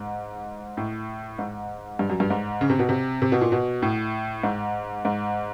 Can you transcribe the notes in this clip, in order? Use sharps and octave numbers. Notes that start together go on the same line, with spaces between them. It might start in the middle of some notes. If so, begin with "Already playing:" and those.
Already playing: G#2
A2
G#2
G2
F#2
G2
G#2
C#3
C3
B2
C3
C3
B2
A#2
B2
A2
G#2
G#2